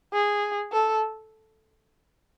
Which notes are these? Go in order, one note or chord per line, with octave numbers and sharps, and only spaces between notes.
G#4
A4